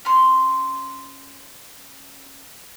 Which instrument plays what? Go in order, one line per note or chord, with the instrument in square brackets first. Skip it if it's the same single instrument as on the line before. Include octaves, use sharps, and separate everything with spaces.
[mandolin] C#4 C6